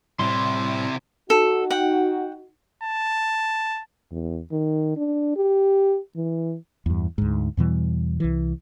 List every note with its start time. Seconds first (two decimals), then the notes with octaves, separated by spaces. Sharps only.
0.19 A2 C3 G3 E4 C6
1.30 D#4 F#4 A4
1.70 F#5 G5
2.83 A5
4.11 E2
4.52 D#3
4.97 D4
5.36 G4
6.16 E3
6.86 E2 G2
7.18 D2 G#2
7.57 E2 B2 E3 G3
8.20 C2 E3